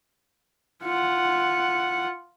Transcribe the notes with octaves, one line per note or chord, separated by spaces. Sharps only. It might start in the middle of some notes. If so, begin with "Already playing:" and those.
F4 F#5